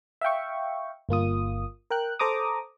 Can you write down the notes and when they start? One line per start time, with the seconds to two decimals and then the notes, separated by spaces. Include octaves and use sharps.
0.21 E5 F5 G5 C#6
1.09 G1 A#3 F4 D#6
1.90 A#4 G5 F#6
2.19 A4 C5 A#5 D6 D#6